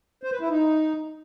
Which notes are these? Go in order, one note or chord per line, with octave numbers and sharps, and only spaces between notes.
C5
B4
E4
D#4